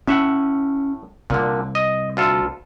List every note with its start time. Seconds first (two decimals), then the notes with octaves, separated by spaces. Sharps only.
0.07 A2 C#4 E5 F#5
1.30 C2 A#2 D3
1.75 D#5
2.17 D2 F4 A4